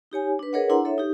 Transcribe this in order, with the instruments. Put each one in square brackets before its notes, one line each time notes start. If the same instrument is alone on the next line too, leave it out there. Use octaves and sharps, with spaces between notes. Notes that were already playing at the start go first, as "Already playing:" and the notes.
[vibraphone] D#4 G4 C#5 G#5
D4 B4
G#4 A#4 B4 C#5 D#5 F#5
D4 E4 F#5 A#5 C6
A4 C#5 E5
D#4 G4